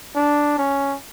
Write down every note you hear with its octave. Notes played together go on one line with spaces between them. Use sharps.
D4
C#4